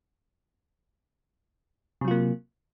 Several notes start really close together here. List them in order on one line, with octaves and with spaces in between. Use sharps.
C3 F#3 F4 A#3